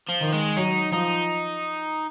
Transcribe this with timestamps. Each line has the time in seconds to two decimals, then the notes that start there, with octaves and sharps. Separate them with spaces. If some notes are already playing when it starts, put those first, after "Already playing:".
0.09 F3
0.21 D#3
0.32 G#3
0.57 F#3 D#4
0.92 F3 D#4